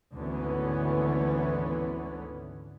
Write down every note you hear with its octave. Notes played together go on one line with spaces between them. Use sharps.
G#1 D2 D3 E3 B3 C#4